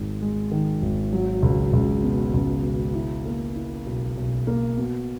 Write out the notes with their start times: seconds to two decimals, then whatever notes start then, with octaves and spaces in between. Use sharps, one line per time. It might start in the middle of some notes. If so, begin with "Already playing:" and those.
Already playing: G#1 D#3 G#3
0.22 G#3
0.51 D#3
0.82 G#1
1.13 F#3
1.42 C#2
1.73 C#2
2.03 B2
2.34 C#2
2.64 B2
2.95 E4
3.25 A#3
3.56 E4
3.86 B1
4.17 B1
4.47 A#3
4.77 B2